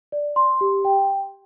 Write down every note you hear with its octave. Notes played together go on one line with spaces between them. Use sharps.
D5
C6
G4
G5